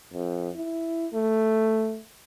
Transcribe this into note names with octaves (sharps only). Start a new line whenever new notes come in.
F2
E4
A3